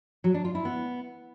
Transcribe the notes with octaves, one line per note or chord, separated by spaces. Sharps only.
F#3
D4
F4
E4
B3